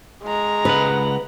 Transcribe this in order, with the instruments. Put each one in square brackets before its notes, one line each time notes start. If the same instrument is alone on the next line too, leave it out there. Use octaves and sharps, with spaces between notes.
[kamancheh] G#3 A#5
[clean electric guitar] C#2 F#5 [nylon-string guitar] B4